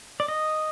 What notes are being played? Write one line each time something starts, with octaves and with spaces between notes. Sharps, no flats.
D5
D#5